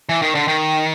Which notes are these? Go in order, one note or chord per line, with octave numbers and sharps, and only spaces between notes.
E3
D#3
D3
D#3